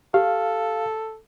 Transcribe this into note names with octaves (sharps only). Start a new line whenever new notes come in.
G4 A4 F5